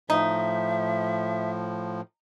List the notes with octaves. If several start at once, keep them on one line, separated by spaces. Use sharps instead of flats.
A2 F3 D#4 E5